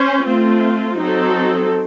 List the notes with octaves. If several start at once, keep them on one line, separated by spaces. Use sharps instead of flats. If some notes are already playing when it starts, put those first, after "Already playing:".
Already playing: C#4 C5
A3 C4 F4
F#3 C4 D#4 A4